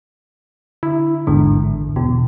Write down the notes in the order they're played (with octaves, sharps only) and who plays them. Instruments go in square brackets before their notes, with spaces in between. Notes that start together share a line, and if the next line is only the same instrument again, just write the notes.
[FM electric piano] D3 [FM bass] E4
[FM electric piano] A1 G#2 D3 [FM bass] E2
[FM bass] E2 [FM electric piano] B2